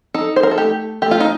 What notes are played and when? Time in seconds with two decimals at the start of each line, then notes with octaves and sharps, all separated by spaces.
0.14 D#4 A4
0.36 C5
0.43 A#4
0.51 A4
0.58 A3 G4
1.02 A3 G4
1.11 F4
1.20 D#4